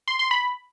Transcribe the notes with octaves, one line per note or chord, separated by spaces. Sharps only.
C6
C6
B5